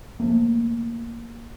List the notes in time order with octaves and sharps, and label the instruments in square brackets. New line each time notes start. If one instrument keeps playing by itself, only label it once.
[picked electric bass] C#3 F3 A3 A#3